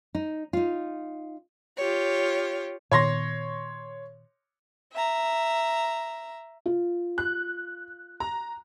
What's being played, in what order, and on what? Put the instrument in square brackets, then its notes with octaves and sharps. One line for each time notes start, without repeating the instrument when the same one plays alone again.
[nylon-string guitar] D#4
D#4 F4
[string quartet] F4 G4 C#5
[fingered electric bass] A#2 D#3 B3 [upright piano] C#5 C6 A#6
[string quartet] E5 A#5
[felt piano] F4
[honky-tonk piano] F#6
A#5